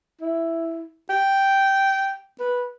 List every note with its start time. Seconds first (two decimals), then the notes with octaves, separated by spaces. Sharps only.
0.21 E4
1.10 G5
2.40 B4